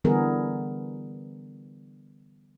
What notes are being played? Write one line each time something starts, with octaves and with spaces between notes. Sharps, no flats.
D3 E3 G3 B3 G#4 A#4